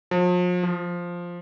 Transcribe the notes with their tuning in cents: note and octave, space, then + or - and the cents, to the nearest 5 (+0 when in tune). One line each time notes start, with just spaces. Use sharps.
F3 +40
F3 +0